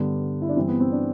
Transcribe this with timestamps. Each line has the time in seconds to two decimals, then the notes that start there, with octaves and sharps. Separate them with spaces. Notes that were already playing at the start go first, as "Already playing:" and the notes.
Already playing: G2 D3 B3
0.42 E4
0.49 D4
0.56 G2 E3 C4
0.68 B3
0.80 C4
0.92 D4